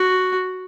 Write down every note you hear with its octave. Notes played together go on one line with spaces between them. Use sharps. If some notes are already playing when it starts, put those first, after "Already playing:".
Already playing: F#4